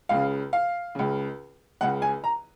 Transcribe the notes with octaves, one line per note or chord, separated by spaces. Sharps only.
C#2 C#3 F5
F5
C#2 C#3
C#2 C#3 F#5
G#5
A#5